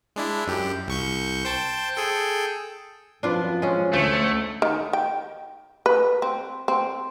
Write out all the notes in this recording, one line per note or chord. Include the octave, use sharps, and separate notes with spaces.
G#3 D4 E4
F#2 G4
C2 C#6 G6
C5 G5 A5
G#4 A4 G5
F#2 F3 C4 D4 F4 B4
G#3 C#4
D2 A3
D#3
G5
B4
C4
C4